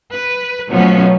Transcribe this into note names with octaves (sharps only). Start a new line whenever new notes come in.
B4
B2 F3 F#3 A3 B3 C#4